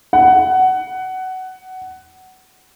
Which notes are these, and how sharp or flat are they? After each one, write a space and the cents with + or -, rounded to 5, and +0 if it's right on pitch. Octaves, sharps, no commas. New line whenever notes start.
F#5 +15